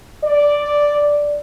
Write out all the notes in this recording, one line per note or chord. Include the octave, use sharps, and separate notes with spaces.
D5